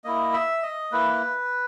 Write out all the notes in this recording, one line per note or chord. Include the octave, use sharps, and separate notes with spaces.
A#3 E4 D#5
E5
D#5
A#3 E4 B4